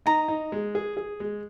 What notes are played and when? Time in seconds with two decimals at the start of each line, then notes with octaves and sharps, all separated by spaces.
0.06 D#4 A#5
0.28 D#4
0.52 G#3
0.75 G#4
0.97 G#4
1.20 G#3